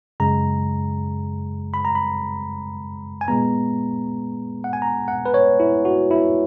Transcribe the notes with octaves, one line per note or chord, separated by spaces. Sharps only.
F#2 C#3 G#3 A#5
B5
A#5
B5
G#5
A#2 G#3 B3 A#5
F#5
G#5
A#5
F#5
B4
C#5
E4
F#4
E4